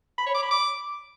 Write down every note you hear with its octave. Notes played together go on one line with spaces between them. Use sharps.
B5
C#5
D6
B5
D6